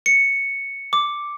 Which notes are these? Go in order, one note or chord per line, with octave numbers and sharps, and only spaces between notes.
C#7
D6